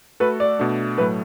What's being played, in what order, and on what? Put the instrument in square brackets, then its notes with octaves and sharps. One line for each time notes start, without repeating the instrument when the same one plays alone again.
[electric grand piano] A3 F#4 A4 [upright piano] B4
[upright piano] D5
[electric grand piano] B2 A3 D4
[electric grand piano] A2 F#3 A3 [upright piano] B4